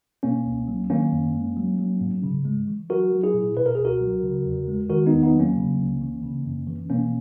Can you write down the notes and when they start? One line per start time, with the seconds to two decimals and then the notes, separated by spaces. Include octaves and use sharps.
0.23 B2 A#3 C#4
0.46 C#2
0.68 F#3
0.90 D#3 A#3 C#4
1.12 F#2
1.34 G#3
1.57 F#3
1.79 F#3
2.01 G#2
2.24 C#3
2.45 G#3
2.68 E3
2.90 F#3 F#4 A#4
3.12 F#3
3.23 E4 G#4
3.34 A#2
3.57 B2 B4
3.66 A#4
3.75 C#2 G#4
3.85 F#4 A#4
4.01 F#3
4.23 C#3
4.45 E2
4.68 G#3
4.89 D#3 F#4 A#4
5.06 B3 D#4
5.12 E2
5.23 B3 D#4
5.34 F#3
5.40 A#3 C#4
5.57 C#3
5.78 C#2
6.01 E3
6.23 C#3
6.45 F#2
6.67 E3
6.89 B2 A#3 C#4